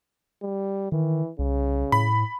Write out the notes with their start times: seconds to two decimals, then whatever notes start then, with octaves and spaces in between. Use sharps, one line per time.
0.42 G3
0.92 D#3 E3
1.39 C2 C#3
1.92 A2 B5